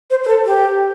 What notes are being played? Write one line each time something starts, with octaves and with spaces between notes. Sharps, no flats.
C5
C5
A4
G4